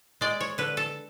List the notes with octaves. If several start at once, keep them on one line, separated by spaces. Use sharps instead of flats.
G#3 D5
C#5
D3 B4
A4